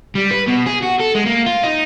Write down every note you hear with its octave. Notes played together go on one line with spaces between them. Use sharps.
G3
B4
B2
G#4
F#4
A4
G#3
A#3
F4
D#4